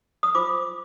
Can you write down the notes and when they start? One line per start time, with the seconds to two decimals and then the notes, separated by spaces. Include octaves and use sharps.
0.23 D#6
0.35 F4 C5 D6